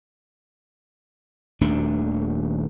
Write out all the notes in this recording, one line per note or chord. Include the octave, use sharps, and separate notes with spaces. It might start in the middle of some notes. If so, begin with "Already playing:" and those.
D#1 D#2 A3 D4